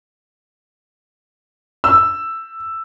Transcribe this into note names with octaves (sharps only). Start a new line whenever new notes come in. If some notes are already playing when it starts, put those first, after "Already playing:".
E6